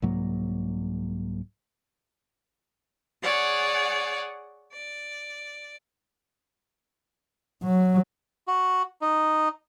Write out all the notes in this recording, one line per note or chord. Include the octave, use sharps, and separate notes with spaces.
C2 G#2 F#3 A#3
G#4 C#5 D5 F#5
D5
F#3
F#4
D#4